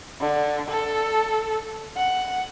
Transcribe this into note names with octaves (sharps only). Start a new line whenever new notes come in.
D3
A4
F#5